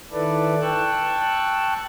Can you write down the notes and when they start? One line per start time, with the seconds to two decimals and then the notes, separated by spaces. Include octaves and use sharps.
0.12 D#3 E4 A4 B4 D5
0.62 G5 A5 C#6 E6 F#6